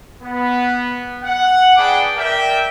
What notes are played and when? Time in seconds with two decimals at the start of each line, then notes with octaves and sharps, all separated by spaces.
0.23 B3
1.23 F#5
1.77 D4 G#4 B4 G5 A5 D6
2.17 A#4 D5 E5 G5